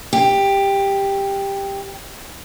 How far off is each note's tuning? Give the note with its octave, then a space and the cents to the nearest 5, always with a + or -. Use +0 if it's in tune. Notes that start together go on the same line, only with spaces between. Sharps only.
G4 +10